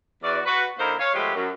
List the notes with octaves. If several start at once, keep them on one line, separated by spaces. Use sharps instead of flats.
E2 F#4 D5
F#4 B4
D3 A#3 D#4 E4 A#4 C5
C#5 F5
F3 G#3 A3 B3 G4
F#2